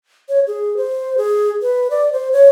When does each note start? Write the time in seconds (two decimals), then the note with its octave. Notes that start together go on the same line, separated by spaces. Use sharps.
0.29 C#5
0.47 G#4
0.77 C5
1.18 G#4
1.62 B4
1.91 D5
2.13 C5
2.33 C#5